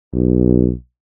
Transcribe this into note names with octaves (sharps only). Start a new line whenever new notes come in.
B1